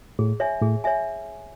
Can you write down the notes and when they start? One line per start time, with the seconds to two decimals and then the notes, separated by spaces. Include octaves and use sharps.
0.19 A2 G#4
0.40 C#5 E5 G#5
0.62 A2 G#4
0.84 C#5 E5 G#5